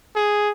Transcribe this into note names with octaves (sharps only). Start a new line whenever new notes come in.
G#4